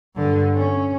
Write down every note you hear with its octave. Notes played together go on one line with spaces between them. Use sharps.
G2 D3
C#4